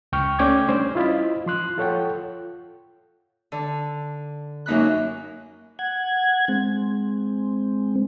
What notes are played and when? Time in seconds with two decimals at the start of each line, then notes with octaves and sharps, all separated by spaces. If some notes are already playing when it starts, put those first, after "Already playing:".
0.12 C#2 G5 C#6 F6
0.39 A3 C#4 D5 G5 D6 G#6
0.69 G3 C#4 D4 C5
0.95 E4 F4 D#5 B5
1.46 F3 C6 F#6
1.78 F4 A4 C#5 F#5 G5
3.52 D3
4.66 F#2 A#3 D#4 B5 F#6
5.79 F#5 G#6
6.48 G#3 C4